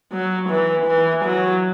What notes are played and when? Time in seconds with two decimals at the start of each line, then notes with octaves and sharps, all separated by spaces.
0.12 F#3
0.50 E3
0.87 E3
1.25 F#3